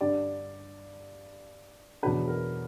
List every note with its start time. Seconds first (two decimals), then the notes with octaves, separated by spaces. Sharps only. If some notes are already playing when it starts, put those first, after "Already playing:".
0.01 G2 D3 G3 D5
2.03 E2 B2 F#3 B3 D4 B4
2.28 A#4